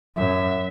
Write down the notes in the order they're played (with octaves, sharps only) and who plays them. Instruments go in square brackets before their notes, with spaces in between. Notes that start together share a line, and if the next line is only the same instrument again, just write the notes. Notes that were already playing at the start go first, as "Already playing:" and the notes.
[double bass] F#2 [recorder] E5